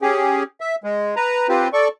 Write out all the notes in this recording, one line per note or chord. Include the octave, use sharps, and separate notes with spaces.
C#4 G4 G#4
E5
G#3
B4 A#5
C4 F4 G4 B4 C5
A4 D5 C#6